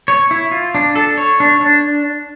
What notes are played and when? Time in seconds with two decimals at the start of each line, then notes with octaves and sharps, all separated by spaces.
0.08 C#5
0.31 E4
0.51 F4
0.75 D4
0.96 A4
1.17 C#5
1.40 D4
1.61 D4